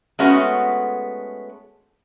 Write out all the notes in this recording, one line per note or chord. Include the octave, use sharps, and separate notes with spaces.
G#3 A3 B3 C#4 F#4